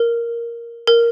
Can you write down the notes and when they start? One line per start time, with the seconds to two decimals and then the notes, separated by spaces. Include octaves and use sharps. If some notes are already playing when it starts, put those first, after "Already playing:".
Already playing: A#4
0.87 A#4